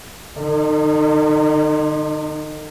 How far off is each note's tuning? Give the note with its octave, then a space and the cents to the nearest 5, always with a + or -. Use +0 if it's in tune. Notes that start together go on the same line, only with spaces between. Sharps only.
D3 +40 D#4 -20